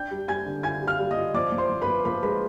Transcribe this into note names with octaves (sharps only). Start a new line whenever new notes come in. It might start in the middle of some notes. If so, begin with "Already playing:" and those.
Already playing: D4 G5 G6
G3
G3 G#5 G#6
D3
F4 G#5 G#6
G3
F5 F6
G3
D#5 D#6
F4
F3 D5 D6
F3
C5 C6
F3
B4 B5
F3
F3 B4 B5
G#3 B4 B5